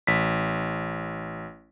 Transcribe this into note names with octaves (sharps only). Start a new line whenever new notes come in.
A1 B6